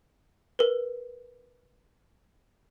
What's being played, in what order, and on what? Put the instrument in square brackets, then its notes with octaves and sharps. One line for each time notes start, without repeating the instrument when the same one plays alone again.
[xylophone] A#4 B4